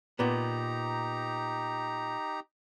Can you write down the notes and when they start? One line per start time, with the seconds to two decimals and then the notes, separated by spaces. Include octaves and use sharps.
0.19 A#2 B3 D#4 G4 A#5